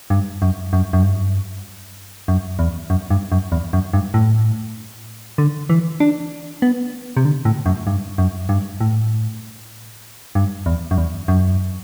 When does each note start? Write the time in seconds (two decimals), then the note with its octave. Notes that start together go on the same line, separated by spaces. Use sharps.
0.10 G2
0.42 F#2
0.73 F#2
0.93 F#2
1.03 G2
2.28 F#2
2.59 E2
2.90 F#2
3.10 G2
3.32 F#2
3.52 E2
3.73 F#2
3.93 G2
4.14 A2
5.38 D3
5.70 E3
6.00 D4
6.62 B3
7.17 C3
7.25 D3
7.45 A2
7.66 F#2
7.87 G2
8.18 F#2
8.49 G2
8.81 A2
10.35 G2
10.66 E2
10.91 F#2
10.98 E2
11.28 F#2